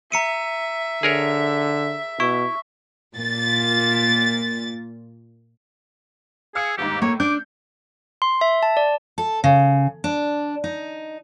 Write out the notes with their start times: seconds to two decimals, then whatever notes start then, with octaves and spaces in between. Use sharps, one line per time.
0.12 E5 A#5 C#7 D#7
1.03 D3 G#4 A#4 C#5
2.20 B2 E4 C#6
3.15 A#2 A6
6.55 G#4 F5 E6 C#7
6.78 G1 D#2 G#2 G4
7.02 A2 A#3 C#5
7.20 D4 D6 G6
8.22 C6
8.41 E5
8.63 A5
8.77 D5
9.18 A4
9.44 C#3
10.04 D4
10.64 D#4